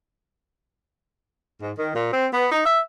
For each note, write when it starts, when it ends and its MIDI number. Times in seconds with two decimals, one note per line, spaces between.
1.61 1.72 44
1.77 1.91 51
1.95 2.10 46
2.11 2.26 60
2.32 2.45 59
2.52 2.64 63
2.65 2.79 76